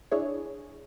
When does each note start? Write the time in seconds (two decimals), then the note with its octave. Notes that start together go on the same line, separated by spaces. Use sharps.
0.11 D4 E4 G#4 C#5